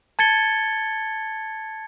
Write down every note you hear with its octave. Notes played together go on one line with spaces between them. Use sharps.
A5 G#6 A6 C#7 G7